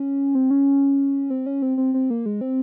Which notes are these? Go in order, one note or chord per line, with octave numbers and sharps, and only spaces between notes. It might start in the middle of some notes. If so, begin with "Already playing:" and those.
Already playing: C#4
C4
C#4
C4
C#4
C4
C4
C4
A#3
G#3
C4